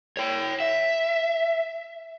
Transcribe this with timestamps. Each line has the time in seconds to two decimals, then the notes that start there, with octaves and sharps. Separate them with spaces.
0.17 C#5 G5
0.60 E5